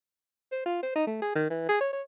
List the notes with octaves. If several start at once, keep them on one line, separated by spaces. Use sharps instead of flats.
C5
F4
C5
D#4
A3
G#4
D#3
E3
G#4
C#5
C#5